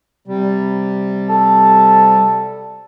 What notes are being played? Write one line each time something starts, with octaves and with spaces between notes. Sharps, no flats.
C3 G3
A4